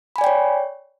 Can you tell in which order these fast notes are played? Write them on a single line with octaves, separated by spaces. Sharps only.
B5 G#5 D5 G5 C#5